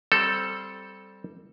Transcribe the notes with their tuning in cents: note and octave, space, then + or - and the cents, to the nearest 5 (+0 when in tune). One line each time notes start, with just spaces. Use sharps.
G3 -10 C4 +0 A4 +0